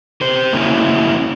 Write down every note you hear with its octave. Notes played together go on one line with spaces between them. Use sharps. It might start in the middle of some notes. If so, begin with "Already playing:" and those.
G4 C5
A#3 C#4 E4